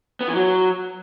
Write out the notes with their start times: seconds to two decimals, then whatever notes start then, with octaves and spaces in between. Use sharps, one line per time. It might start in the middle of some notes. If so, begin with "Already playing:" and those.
0.21 B3
0.28 E3
0.35 F#3